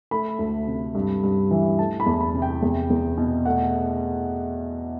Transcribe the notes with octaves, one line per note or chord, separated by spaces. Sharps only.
A3 B5
D2
C3
G2
G2
E3
A3 A5
B5
E2
B5
C3
G5
E2
E2
B2
A3 F#5